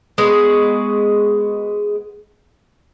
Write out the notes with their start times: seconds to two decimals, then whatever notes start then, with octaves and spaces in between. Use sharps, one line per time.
0.18 G#3 B3 F#4